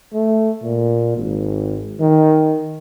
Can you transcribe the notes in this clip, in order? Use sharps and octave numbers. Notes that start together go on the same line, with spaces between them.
A3
A#2
G#1
D#3